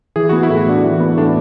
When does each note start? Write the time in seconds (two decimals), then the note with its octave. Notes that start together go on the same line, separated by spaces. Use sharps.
0.16 E3 G#4
0.29 B3 F#4
0.43 E4
0.49 A2
0.57 F#4
0.67 D4
0.84 E3
1.00 B3
1.17 A2 D4